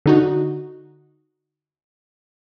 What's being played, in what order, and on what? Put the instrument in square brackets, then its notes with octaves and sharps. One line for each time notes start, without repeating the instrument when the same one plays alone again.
[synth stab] D3 D#4 F#4